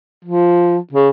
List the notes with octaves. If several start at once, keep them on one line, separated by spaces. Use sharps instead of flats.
F3
C#3